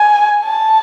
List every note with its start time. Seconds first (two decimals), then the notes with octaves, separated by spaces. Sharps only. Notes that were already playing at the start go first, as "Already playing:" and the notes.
Already playing: G#5
0.45 A5